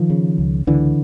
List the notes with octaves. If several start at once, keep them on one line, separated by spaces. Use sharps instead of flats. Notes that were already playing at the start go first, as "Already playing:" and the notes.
Already playing: D#3 F3
C#3
C#2
C#2 D3 E3